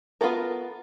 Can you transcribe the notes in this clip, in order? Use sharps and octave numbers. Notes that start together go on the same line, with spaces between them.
B3 F4 F#4 A4 A#4